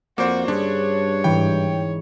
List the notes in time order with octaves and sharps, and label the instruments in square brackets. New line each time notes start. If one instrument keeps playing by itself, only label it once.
[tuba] F2 [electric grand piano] A#3 C5 [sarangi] F#4 [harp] D5
[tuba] G2 [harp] C#4 G#4 C5 [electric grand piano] D4 [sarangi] C#5
[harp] G#2 E3 [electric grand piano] G5